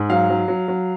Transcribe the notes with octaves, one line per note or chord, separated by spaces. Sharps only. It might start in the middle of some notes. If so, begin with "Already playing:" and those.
Already playing: G#2
F#3 F5
F#3
F#3
F#3